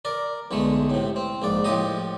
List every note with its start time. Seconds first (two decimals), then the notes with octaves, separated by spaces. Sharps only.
0.05 A#4 D5
0.51 B1 D3 G#3 A3
0.90 A2 C3
1.16 C4
1.42 A#1 G#2 D5
1.64 A2 F3 G4 D#5